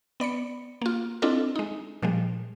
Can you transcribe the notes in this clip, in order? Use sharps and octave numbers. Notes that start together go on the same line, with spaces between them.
B3 D5 B5 C#7
A#3 F4
C4 D4 E4 F4 A4 D#5
G#3 D#4
A#2 F3 G3 G#3